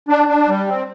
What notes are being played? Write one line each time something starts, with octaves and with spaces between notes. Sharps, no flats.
D4
D4
G3
C4